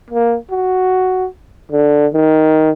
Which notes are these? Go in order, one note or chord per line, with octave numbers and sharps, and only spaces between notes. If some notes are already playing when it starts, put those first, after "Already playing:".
A#3
F#4
D3
D#3